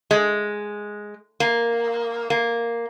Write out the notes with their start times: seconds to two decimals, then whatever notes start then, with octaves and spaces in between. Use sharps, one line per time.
0.11 G#3
1.40 A#3
2.30 A#3